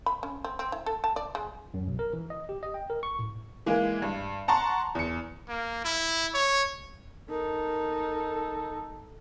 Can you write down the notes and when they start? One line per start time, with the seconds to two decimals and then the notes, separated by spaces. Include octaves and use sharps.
0.06 B5
0.23 C#4
0.44 C4
0.59 C4
0.72 E4
0.86 A4
1.04 A5
1.16 D5
1.35 G#3
1.74 F#2
1.87 B1
1.99 A#4
2.13 E3
2.30 D#5
2.49 G4
2.63 D#5
2.74 G5
2.90 A#4
3.03 C#6
3.19 A2
3.66 E3 G#3 A#3
4.02 G2
4.48 F#5 A5 A#5 C6 C#6
4.95 E2 C#7
5.49 A#3
5.84 E4
6.34 C#5
7.30 D#4 A4 A#4